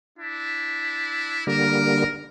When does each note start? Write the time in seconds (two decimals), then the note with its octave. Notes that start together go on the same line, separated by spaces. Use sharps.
0.19 D4 E4
1.47 D3 G3 A#3 A#4